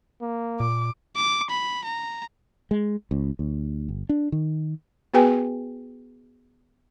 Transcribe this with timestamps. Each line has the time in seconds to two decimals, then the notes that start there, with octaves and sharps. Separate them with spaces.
0.22 A#3
0.60 A#2 D6
1.16 D6
1.50 B5
1.85 A#5
2.71 G#3
3.11 C#2
3.39 D2
3.89 G1
4.09 D4
4.32 D#3
5.14 B3 F#4 G#4 B4 G5 G#5